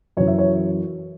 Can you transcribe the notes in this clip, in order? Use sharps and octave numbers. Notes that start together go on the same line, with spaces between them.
F#2 E3 C#5
E5
C#5